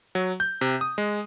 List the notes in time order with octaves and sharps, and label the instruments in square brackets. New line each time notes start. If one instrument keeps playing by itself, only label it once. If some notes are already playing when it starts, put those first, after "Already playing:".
[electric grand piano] F#3
G6
C3
D#6
G#3